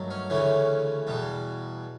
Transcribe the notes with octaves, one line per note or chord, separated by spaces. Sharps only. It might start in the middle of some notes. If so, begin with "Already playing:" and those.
Already playing: G2 D#3 F#3 A3
C#4
D2 C#3 E3 A3 C#4
E2 B2 G3